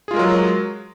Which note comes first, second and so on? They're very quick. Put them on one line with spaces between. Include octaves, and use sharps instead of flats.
G#4 F4 G#3 A#4 F#3